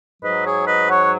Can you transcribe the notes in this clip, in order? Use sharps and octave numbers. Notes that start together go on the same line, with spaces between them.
G#2 F#3 B4 D#5
G#4 C#5
B4 D#5
C#5 F#5
F#5